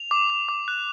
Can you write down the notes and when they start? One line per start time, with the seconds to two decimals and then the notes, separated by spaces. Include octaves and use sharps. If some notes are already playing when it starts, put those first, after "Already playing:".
Already playing: F7
0.11 D6
0.30 D6
0.49 D6
0.68 F#6